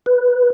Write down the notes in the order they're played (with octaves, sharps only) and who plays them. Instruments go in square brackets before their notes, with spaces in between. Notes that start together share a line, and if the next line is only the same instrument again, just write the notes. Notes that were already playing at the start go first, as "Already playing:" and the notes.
[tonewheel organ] B4